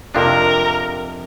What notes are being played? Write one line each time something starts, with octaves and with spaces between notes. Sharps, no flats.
F2 C3 F3 A#3 D4 A#4